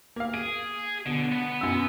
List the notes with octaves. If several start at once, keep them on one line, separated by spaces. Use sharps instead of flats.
A#3 F5
G#4 D7
B2 D3
B3
F#2 B2 E6